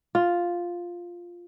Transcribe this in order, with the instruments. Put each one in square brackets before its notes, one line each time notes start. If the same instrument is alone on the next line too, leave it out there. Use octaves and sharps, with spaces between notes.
[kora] F4